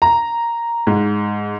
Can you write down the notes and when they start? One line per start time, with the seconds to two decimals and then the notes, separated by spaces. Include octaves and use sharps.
0.02 A#5
0.87 G#2